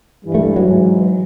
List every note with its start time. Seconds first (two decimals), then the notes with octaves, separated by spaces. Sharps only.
0.24 G2 E3 G3
0.35 A3
0.56 F#3
0.67 G#2 E3 G#3